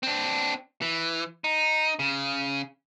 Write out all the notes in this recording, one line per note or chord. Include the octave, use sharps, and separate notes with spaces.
C4 D4
E3
D#4
C#3